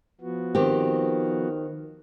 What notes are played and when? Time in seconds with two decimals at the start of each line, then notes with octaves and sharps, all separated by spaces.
0.21 F3 B3 F#4
0.55 D#3 C4 G4